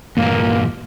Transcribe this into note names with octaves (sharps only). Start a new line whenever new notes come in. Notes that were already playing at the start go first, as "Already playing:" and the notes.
E2 G2 A#2 A#3